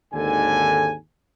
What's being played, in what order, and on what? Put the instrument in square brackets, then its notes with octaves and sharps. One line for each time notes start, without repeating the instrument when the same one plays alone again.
[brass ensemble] G#1 D#2 G#2 D3 A4 G#5